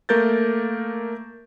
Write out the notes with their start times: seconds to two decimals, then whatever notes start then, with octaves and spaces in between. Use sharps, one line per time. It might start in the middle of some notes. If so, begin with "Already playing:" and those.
0.09 A3 A#3 A#4 G6 A6